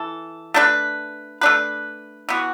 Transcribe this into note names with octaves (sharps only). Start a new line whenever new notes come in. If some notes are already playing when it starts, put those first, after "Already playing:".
Already playing: E3 A4
A3 D4 B4
A3 D4 B4
E3 B3 F#4